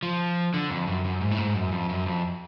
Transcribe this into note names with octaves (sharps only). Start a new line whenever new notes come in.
F3
D3
F2
F#2
F#2
G#2
A2
G#2
F#2
F2
F#2
F2